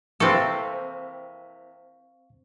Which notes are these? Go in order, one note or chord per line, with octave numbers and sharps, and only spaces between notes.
C3 E3 A#3 C4 A4 F5 C#6